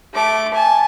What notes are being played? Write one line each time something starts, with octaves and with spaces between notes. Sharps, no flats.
A3 D6
G#5 A5